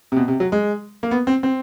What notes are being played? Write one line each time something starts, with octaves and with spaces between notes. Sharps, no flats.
C3
B2
C3
F#3
G#3
A#3
B3
C4
C4